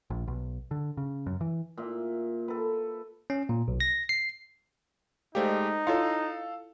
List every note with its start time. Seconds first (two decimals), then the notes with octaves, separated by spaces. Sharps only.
0.10 A#1
0.28 B1
0.71 D3
0.97 C#3
1.27 F#2
1.41 E3
1.77 A#2 E5
2.48 A4 B4
3.30 C#4
3.49 A#2
3.68 B1
3.80 A#6
4.09 C7
5.35 G#3 A3 D#4 G4 C5 D5 F5
5.87 E4 F4 A4 C#5 F5